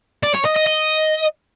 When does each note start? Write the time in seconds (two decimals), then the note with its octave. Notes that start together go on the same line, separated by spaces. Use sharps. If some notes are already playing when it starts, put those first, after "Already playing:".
0.23 D5
0.34 C#5
0.45 D#5
0.56 D#5
0.66 D#5